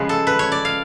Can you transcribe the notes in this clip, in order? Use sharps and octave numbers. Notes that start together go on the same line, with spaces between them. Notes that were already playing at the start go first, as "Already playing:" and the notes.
Already playing: C#3 F3 G#3 B4
A4
B4
C#5
D5
F5